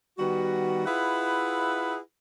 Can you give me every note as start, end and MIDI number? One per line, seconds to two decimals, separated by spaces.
0.18 0.83 51
0.18 0.83 55
0.18 0.83 59
0.18 0.83 66
0.86 1.97 64
0.86 1.97 65
0.86 1.97 68
0.86 1.97 71
0.86 1.97 76
0.86 1.97 78